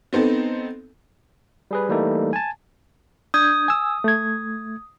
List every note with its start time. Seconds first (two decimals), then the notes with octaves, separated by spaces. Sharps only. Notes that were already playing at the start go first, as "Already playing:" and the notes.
0.13 B3 C4 D#4 A4
1.71 G3 G#4 B4
1.89 E3 G3 A3 A#3 D#4 A4
2.33 G#5 A5
3.34 D4 D#6 G6 G#6
3.68 G#5 E6
4.04 A3 G#6